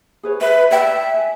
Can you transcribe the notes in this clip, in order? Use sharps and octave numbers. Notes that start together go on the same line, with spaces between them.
G#4 B4 C#5
B4 E5
D5 E5 G5 A5
G#5